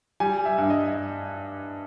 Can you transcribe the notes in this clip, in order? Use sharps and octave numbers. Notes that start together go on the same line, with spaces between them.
G3 G#5
E5
G2
D#5